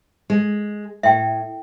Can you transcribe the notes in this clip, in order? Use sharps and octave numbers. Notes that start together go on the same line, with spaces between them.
G#3
A2 E5 G5